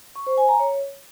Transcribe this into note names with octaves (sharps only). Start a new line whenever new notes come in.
C#6
C5
G#5
A#5
C#5